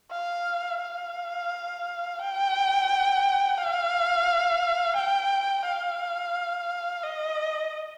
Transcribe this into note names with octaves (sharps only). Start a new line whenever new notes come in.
F5
F5
G5
F5
G5
F5
D#5